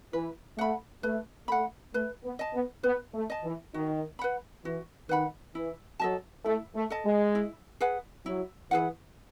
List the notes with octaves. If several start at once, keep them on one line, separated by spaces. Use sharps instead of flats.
E3 B4
A3 F#5 B5
A3 B4
A3 F#5 B5
A3 B4
B3
D#5 A5
B3
B3 B4
A3
D#5 A5
E3
D#3 F#4
B4 F#5 B5
E3 F#4
D#3 B4 F#5 B5
E3 E4
F#3 A4 D#5 A5
A3 E4
A3
A4 D#5 A5
G#3
E4
G#4 B4 F#5
F#3 E4
E3 G#4 B4 F#5